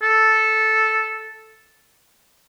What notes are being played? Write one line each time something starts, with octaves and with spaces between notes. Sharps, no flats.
A4